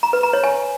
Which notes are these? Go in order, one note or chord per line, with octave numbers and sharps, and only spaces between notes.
A#5
B4
A#5
C#5
G#5